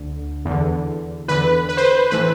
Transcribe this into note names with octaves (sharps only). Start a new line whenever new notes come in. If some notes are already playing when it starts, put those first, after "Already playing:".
Already playing: D2 D3
E2
D3
E2 D3 B4
B4
C5
B4
A2 E3 B4